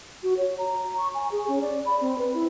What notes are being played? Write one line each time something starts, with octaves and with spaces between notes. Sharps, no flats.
F#4
C#5
A#5
C#6
G#5
G#4
C#4
D5
B5
C4
B4
E4